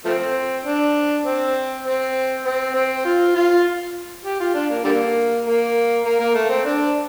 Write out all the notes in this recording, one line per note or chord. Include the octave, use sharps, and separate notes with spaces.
F3 A3 C4
D4
C4
C4
C4
C4
F4
F4
G4
F4
D4
A#3
D3 G3 A#3
A#3
A#3
A#3
A3
C4
D4